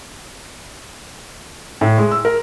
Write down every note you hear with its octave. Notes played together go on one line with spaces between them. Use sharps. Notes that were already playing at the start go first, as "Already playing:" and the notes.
A2
G#3
E6
A#4